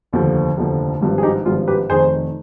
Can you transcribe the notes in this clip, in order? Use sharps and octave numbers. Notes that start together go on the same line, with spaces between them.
F1 D#2 D3 F3
F1 D#2 D3 F3
G#1 G2 F3
G#4
D#4 G4
G#1 G2 F3 F4 G#4
G4 B4
F1 F2 D#3 G#4 C5